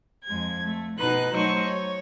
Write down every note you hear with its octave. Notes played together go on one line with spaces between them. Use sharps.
F2 G#3 G#6
A3
B2 D#4 B4 F#6
F#3 A3 D#4 C5 C#5 C#6
C#5